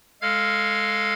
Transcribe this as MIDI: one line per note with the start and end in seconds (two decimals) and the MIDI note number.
0.22 1.14 56
0.22 1.14 69
0.22 1.14 77
0.22 1.14 89
0.22 1.14 92